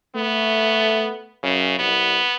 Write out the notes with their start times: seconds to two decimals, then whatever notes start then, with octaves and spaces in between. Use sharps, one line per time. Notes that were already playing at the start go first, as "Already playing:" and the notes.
0.15 A3 B3
1.43 F#2 C#3
1.79 C2 B3